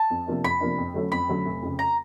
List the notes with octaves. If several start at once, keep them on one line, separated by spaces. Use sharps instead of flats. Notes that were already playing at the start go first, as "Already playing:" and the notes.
Already playing: A5
F2
C3 F3 A#3 D4
F2 B5
C3 F3 A#3 D4
F2
D3 F#3 A3 C#4
F2 B5
D3 F#3 A3 C#4
F1
F2 C#3
A#5